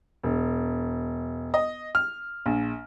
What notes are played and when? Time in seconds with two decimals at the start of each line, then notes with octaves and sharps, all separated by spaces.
0.23 E1
1.54 D#5
1.95 F6
2.46 A#1